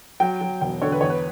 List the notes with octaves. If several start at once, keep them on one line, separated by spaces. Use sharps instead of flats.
F#3 G5
F#3
E1 G5
D3 C#5
B4
E2 C#5
B4